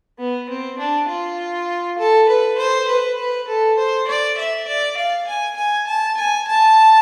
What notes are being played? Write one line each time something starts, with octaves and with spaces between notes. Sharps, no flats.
B3
C4
D4
F4
A4
B4
C5
B4
B4
A4
C5
D5
E5
D5
F5
G#5
G#5
A5
G#5
A5